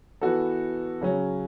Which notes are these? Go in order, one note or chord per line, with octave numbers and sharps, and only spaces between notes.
E3 B3 F#4 A4
C#3 F#3 C#4